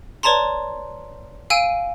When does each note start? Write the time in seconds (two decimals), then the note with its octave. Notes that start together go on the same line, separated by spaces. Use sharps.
0.23 B4 C#5 D5 A5 A#5 C6
1.50 F5 G#5 E6 D7 D#7